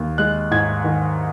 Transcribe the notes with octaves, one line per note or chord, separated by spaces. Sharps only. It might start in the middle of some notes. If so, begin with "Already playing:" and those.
Already playing: D#2
G#3 F#6
G#2 G#6
D#3